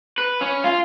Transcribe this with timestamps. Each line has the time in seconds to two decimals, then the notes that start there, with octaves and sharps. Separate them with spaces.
0.18 B4
0.41 C#4
0.64 F4